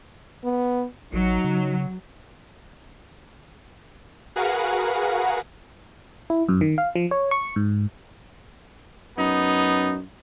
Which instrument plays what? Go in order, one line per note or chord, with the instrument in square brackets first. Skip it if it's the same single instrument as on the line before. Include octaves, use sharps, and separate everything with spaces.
[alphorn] B3
[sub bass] A1 [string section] F#3 [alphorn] D#4
[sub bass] C#3
[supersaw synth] F#4 G#4 A#4 B4 F5 F#5
[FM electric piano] E4
F#2
D#3
F5
F3
C#5
C#6
G#2
[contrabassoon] F#2 [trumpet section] B3 D#4